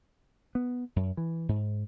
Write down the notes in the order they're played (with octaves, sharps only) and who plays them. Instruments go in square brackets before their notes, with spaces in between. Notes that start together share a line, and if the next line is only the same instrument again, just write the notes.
[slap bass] B3
F#2
E3
G#2